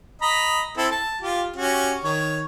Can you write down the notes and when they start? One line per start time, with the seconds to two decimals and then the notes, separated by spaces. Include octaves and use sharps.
0.22 D#5 A#5 B5
0.77 C4 E4 A4
0.92 A5
1.21 F4 G4
1.56 C#4 F#4 G4
2.04 D#3 C#5